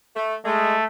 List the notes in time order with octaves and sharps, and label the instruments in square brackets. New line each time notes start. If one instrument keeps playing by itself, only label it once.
[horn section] A3
[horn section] G#3 [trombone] A3